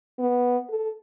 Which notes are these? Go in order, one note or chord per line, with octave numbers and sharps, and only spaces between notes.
B3
A4